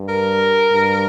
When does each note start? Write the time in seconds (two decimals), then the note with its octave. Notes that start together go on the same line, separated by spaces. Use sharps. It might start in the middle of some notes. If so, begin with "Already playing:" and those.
Already playing: G2
0.09 A#4
0.72 G2